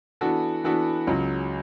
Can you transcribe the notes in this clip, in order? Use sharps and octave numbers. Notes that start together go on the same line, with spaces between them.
E3 B3 D4 F#4 A4
E3 B3 D4 F#4 A4
C#2 C#3 F#3